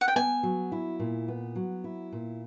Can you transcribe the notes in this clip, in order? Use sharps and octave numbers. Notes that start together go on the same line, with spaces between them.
F#5
G5
B3 G#5
F#3
E4
A#2
B3
F#3
E4
A#2